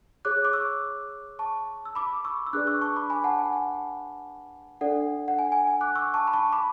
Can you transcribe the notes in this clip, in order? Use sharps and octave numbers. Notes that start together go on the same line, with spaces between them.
G#4 C#5 D6 F#6
D6
C#6 E6
A5 C#6
E6
B5 D6
C#6 E6
E6
D4 G#4 B4 D5 D6 F#6
C#6 E6
A5 C#6
B5 D6
G#5 B5
F#5 A5
G#5
F#5
D4 A4 D5 F#5
F#5
G#5
G#5
G#5
D6 F#6
C#6 E6
A5 C#6
B5
A5 C#6
B5 D6